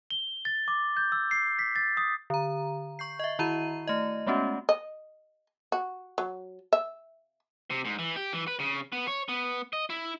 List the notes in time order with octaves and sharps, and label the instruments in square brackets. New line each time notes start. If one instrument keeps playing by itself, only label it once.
[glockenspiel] G7
A6
D6
G6
E6
C7
B6
A6
D#6
[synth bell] D3 A#5
C#6 G6 C7
D#5 E5
D#3 E4 F#4 A#5 D#7
A3 D#5
G#3 A3 B3 C#4 F#4
[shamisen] D#5
F#4
F#3
E5
[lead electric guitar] C3
G#2
E3
G4
E3
B4
C#3
B3
C#5
B3
D#5
E4